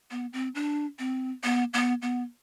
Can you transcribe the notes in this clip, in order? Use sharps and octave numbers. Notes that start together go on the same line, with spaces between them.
B3
C4
D4
C4
B3
B3
B3